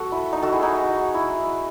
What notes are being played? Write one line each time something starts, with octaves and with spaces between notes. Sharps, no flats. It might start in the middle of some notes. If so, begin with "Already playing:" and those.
Already playing: F#4 A4
E4
D#4
F#4 A4
E4 G#4
D#4 F#4
E4